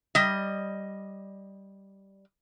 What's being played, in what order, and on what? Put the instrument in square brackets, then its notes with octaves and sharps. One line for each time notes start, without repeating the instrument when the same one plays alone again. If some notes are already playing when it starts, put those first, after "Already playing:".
[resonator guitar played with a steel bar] G3 D#5